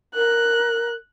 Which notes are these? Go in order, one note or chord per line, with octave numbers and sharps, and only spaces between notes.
A#4 F#6